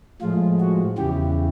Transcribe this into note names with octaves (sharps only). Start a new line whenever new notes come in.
A2 F3 G#3 F4
F#4
E2 C#3 E3 G4